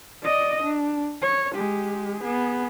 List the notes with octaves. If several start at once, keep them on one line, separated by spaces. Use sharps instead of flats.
D5 D#5
D4
C#5
G#3 G4
B3 G#4